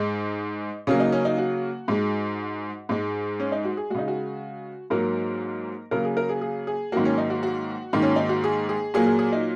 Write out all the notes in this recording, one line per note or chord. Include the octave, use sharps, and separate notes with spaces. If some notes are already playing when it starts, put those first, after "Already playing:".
Already playing: G#2 G#3 D#4
C#3 F#3 A#3 C#4
D#4
C#4
D#4
F#4
G#2 G#3
G#2 G#3
C#4
D#4
F#4
G#4
C#3 G#3 D#4 F#4
F#4
G#2 F#3 A#3 A#4
C#3 F#3 A#3 A#4
G#4
A#4
G#4
G#4
G#4
G#2 D#3 F#3 A#3 F#4
C#4
D#4
F#4
F#4
G#2 D#3 A#3
C#4
D#4
F#4
G#4
G#4
A#2 F#3 A#3 G#4
G#4
G#4
D#4